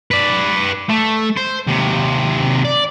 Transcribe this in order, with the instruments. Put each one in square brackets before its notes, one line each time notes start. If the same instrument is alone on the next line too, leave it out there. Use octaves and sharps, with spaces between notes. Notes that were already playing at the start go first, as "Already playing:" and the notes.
[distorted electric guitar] B4 D5
A3
C5
D#2 C3
D5